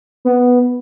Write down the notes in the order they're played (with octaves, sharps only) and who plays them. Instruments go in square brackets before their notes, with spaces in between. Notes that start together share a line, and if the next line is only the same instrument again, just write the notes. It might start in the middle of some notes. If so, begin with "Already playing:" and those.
[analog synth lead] B3